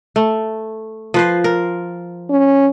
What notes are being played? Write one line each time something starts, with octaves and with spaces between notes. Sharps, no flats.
A3
F3 B4 C5
A#4
C#4